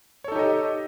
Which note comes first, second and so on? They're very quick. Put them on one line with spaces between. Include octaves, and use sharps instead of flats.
C#5 A4 D#4 G4 D#5